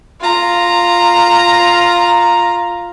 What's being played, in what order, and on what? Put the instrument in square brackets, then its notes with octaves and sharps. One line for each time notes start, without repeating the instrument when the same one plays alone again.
[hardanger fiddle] F4 A#5